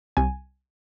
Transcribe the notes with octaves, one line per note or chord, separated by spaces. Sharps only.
C2 G#5